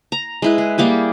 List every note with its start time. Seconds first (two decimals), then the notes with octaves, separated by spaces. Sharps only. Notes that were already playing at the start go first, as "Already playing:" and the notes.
0.12 A#5
0.42 G#3 E4 B4
0.58 G#4
0.78 G3 A#3 G4 G#4